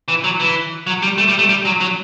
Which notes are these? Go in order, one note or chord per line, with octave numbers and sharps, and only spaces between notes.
E3
F#3
E3
F#3
G3
A3
G3
A3
G3
F#3
F#3